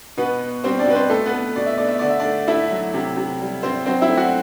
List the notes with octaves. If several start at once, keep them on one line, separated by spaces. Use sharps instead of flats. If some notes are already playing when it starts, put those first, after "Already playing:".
B2 B3 B4
B3
G3 C4 C5
D4 D5
B2 B4
C4 C5
A3 A4
B3 B4
A3
B2 D5
E5
A3 D5
E5
D3 D5
E5
D4 D5
A3
A3 E4 E5
F#3
C3
C3
G3
G3 C4 C5
F#3 C4 C5
E4 E5
A3
F#4 F#5